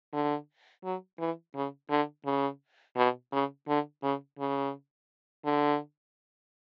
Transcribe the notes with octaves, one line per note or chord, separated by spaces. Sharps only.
D3
F#3
E3
C#3
D3
C#3
B2
C#3
D3
C#3
C#3
D3